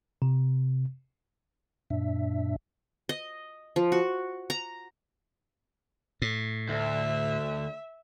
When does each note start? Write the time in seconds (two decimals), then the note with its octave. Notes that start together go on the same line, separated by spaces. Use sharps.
0.22 C3
1.90 F#2 A#2 D4 E5
3.09 D#5
3.76 F3
3.92 F#4
4.50 A#5
6.22 A2
6.69 D2 E5